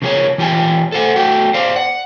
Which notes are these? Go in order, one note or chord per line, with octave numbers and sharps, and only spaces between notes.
C#3 F3 A#3 F#4 G#4 C#5
E3 F4 G4 G5 G#5
A4 C5 F#5
A3 F#4 G5
C5 D5 F5
F#5